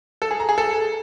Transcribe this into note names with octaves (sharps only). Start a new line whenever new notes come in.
A4
G#4
A#5
G#4
A4